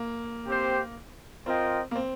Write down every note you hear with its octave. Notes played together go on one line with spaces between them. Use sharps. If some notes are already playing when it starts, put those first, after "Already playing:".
Already playing: A#3
C4 G4 C5
C4 F4 A#4 D#5 G5
A#3
C4